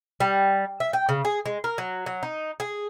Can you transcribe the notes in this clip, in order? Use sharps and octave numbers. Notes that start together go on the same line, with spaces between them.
G3
E5
G5
C#3
G#4
G#3
A#4
F#3
F#3
D#4
G#4